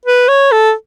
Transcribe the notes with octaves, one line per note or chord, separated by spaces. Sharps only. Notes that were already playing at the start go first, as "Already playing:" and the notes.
B4
C#5
A4